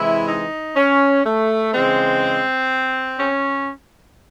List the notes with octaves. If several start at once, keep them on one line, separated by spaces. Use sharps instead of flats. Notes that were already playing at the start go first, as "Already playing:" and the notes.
Already playing: C3 E3 G#3 E4
D#4
C#4
A3
C#3 E3 G#3 C4
C#4